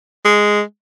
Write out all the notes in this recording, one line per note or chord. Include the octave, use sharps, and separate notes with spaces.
G#3